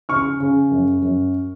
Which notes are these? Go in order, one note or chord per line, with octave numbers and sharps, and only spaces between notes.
C#3 C#6 F6
C#3
F#2
F#2